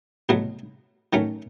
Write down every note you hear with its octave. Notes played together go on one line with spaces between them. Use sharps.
C2 B2 F#3 A3
D#3 F#3 A3 C#4